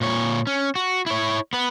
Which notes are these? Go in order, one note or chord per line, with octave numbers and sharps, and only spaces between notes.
A#2 C#5
C#4
F#4
E4 C#5
B3 B4